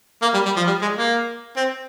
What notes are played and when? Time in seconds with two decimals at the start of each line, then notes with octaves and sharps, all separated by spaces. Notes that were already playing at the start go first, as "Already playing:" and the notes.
0.22 A#3
0.34 G3
0.45 G3
0.56 F3
0.67 G3
0.82 G#3
0.97 A#3
1.56 C4